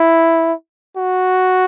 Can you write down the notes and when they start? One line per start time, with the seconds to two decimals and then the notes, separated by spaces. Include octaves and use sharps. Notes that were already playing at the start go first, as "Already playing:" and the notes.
Already playing: E4
0.97 F#4